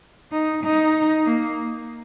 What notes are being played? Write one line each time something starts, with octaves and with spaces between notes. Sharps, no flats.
D#4
D#4
A#3